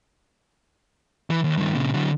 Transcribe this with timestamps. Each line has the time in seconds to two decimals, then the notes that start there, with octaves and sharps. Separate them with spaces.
1.30 E3
1.44 D#2
1.57 G2 D#3
1.75 A#2 C#3
1.94 D3 F#3